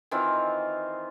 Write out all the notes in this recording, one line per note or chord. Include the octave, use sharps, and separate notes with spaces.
D#3 E3 C4 F4